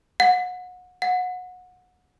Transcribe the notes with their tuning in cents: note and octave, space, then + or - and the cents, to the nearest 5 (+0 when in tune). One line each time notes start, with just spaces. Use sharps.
F#5 -30
F#5 -25